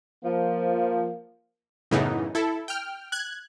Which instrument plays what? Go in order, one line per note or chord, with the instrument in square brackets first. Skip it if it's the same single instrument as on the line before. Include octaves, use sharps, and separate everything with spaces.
[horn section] F3 [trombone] A#3
[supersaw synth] F#2 A2 C#3 E3 B3 D#4
E4 A4
G5 F6
F#6 G#6